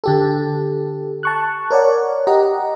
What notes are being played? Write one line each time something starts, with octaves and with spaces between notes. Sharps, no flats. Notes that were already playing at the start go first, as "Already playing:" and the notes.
D3 G4 A4
A5 C#6 F#6
A#4 C#5 D5 F#5
G4 D#5 F#5 A#5